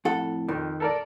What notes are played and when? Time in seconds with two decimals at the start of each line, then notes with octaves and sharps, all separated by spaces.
0.05 F2 A2 A4 F#5
0.49 F2 D#3
0.80 A4 A#4 D5